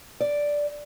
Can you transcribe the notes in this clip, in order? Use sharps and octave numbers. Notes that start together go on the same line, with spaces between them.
D5